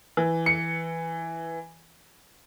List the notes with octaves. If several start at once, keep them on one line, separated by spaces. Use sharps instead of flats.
E3
C#7